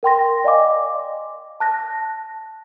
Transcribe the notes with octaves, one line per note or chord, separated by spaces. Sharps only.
A#4 G5 C6 A#6
D5 D#5 F5 G#5 D6
A5 F#6 A#6